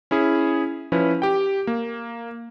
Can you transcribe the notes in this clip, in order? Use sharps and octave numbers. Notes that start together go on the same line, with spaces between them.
C#4 E4 G#4
F3 C#4 E4 B4
G4 G5
A#3